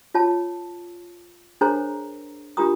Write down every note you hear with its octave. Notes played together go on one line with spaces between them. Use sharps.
F4 C#5 A5
D4 G#4 A#4 C5 C#5 A#5
D4 F4 G4 A#4 A#5 D#6